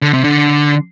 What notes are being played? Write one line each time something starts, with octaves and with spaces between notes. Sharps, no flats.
D3
C3
D3